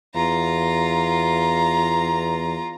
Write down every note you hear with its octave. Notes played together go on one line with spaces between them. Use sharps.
E2 F4 A#5